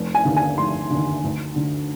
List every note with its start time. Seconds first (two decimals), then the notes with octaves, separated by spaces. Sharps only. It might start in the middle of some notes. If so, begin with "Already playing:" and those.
Already playing: F1
0.15 G#5
0.25 D#2 D3
0.36 G#5
0.58 F1 C6
0.90 D#2 D3
1.24 D2
1.56 D3